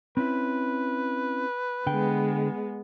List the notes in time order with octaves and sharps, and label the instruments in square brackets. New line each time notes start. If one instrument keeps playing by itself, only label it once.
[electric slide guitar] C4 C#4 E4 [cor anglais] B4
[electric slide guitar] D3 G5 [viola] G#3 B3